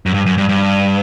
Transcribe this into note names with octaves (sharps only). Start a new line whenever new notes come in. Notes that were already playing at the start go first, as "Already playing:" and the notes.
F#2
G2
F#2
G2
G2